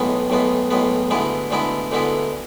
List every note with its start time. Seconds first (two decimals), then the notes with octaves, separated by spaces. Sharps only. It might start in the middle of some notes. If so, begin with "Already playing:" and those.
Already playing: B1 A2 G#3 B3
0.30 B1 A2 G#3 B3
0.70 B1 A2 G#3 B3
1.11 D2 D3 G#3 B3 E4
1.51 D2 D3 G#3 B3 E4
1.92 D2 D3 G#3 B3 E4